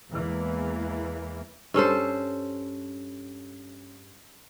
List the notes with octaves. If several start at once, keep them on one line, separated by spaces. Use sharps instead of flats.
E2 E3 G#3 A#3
G2 C#4 A4 C5